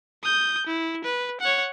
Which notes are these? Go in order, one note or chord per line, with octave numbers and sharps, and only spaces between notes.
D#6 G6
E4
B4
C#5 F#5